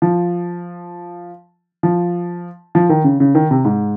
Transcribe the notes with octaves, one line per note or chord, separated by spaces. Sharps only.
F3
F3
F3
D#3
C#3
C#3
D#3
C3
G#2